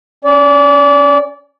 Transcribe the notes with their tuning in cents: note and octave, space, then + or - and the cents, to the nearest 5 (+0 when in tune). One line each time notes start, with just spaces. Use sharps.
C#4 +0 D5 -30